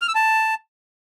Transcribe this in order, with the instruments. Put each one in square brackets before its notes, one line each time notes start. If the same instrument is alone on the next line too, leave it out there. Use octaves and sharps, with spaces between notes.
[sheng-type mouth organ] F6
E6
A5